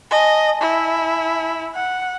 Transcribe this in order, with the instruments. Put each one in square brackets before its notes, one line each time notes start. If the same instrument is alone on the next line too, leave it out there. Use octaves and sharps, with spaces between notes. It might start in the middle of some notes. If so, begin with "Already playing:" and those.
[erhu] D#5 [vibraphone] G#5 A5
[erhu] E4
F#5